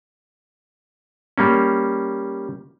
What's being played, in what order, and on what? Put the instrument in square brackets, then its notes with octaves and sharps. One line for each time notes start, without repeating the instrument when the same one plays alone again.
[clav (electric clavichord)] G3 A#3 C#4